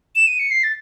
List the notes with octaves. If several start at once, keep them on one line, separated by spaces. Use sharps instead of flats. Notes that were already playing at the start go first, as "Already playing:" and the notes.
E7
D#7
C#7
C7
A6